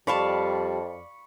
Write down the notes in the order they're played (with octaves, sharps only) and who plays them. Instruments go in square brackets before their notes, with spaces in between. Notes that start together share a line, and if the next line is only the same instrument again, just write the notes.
[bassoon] F2 [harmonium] G3 [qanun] D5 F5 A5 [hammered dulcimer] B5 C#6